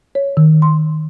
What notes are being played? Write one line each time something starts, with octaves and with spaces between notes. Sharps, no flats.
C#5
D#3
C6